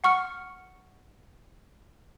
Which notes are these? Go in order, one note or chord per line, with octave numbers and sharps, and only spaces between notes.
F#5 C#6 F6 C#7